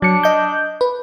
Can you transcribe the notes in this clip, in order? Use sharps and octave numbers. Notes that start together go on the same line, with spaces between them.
F#3 D4 C#7
D#5 G6
B4